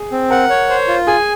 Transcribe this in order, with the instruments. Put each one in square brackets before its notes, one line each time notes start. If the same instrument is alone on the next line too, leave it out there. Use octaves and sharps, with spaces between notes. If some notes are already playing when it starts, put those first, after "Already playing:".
Already playing: [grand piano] G#4
[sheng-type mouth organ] C4
[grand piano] A#4 [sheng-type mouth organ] F#5
[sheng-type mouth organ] C#5
C5
F4
[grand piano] G#4 [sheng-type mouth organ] G#5